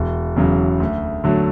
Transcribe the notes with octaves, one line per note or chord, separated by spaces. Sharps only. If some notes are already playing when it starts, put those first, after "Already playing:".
Already playing: E1
E2 C#3 F#3
D2
D3 F#3 A3